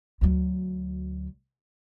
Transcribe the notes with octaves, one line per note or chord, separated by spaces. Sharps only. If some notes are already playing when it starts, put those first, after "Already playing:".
D2 F#3